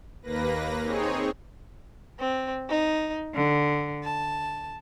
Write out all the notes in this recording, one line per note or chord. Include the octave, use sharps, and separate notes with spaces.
D#2 A#3 B4 A#6
C4 D#4 G#4 C#5
C4
D#4
D3
A5